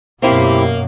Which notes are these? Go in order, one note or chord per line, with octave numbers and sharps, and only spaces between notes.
F#2 B2 A#3 C4 E4 G4